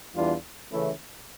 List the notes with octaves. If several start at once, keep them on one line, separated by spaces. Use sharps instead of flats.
E2 E3 G3 D4 F4
C#3 E3 A3 C#4 E4